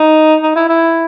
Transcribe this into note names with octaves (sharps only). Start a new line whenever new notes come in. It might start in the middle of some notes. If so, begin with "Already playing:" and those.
Already playing: D#4
D#4
E4
E4